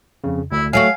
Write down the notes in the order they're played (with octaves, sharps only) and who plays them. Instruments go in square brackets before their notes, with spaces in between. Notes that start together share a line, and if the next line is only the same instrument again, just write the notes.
[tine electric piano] F2 C#3
[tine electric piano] D2 [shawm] E4
[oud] F#3 A3 F#4 [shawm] F5 [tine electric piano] G#5